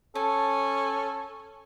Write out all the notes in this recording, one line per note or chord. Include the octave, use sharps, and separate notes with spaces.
C#4 A4 A5